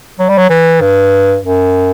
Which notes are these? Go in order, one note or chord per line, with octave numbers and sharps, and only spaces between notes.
F#3
G3
F#3
E3
G2
F#2